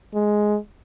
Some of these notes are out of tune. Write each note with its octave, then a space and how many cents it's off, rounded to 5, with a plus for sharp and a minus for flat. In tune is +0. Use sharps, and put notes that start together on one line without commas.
G#3 +5